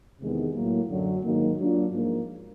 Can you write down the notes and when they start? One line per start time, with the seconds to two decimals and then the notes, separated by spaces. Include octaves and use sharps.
0.20 E2 C3 D#3 G#3 B3
0.54 A2 F#3 A#3
0.89 F#2 D3 F#3
1.23 G#2 D#3 F#3 A#3
1.58 F#3 A#3 D4 F4
1.93 G#2 F3 A#3